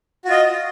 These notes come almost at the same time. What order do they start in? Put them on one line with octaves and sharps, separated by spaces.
F#4 F4 D#5